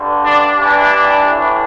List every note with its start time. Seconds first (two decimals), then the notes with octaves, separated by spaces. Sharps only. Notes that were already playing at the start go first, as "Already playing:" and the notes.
Already playing: G2 D3
0.23 D4
0.57 G2 E3 D4
1.25 A2 E3